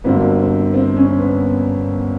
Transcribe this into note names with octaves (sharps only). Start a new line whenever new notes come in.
G1 G2 D3 F#3 A#3 C4
C4
C4
C#4
B3